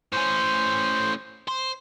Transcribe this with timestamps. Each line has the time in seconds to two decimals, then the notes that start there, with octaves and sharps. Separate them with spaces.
0.13 A2 C#4 C5
1.48 C5